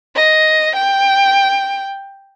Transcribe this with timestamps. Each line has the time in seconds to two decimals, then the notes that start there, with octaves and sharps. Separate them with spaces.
0.15 D#5
0.76 G5